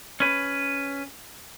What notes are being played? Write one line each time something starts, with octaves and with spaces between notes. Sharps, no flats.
C#4 B4